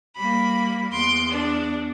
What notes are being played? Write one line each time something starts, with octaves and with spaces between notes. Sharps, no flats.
G3 A#3 B5
E2 C6 D7
D4